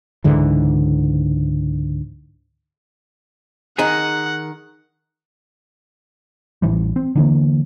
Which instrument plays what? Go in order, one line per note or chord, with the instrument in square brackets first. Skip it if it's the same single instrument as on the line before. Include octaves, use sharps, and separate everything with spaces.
[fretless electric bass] C#2 G#2 D3 E3
[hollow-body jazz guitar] D#3 D#4 G#4 [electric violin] F#5
[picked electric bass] A1 E3 G3
C4
D3 E3 A#3